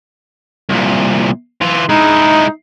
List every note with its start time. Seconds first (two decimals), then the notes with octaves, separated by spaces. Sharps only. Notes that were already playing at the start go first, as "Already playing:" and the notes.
0.70 C2 A#2
1.61 E3 F4
1.89 G#3 D#4 E4